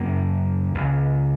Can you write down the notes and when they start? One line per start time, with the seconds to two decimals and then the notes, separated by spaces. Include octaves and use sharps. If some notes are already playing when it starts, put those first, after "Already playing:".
Already playing: F#2 C#3 A#3
0.75 C#2 C#3